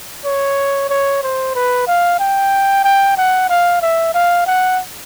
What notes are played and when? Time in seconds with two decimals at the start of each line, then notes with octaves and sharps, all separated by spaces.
0.25 C#5
0.89 C#5
1.23 C5
1.55 B4
1.87 F5
2.19 G5
2.84 G5
3.17 F#5
3.49 F5
3.82 E5
4.14 F5
4.46 F#5